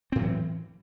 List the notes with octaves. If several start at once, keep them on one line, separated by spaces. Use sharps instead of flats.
A2 E3 F#3 C4